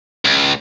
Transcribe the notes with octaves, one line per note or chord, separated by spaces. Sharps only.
C#2